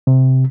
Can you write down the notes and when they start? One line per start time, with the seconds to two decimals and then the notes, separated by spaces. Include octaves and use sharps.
0.07 C3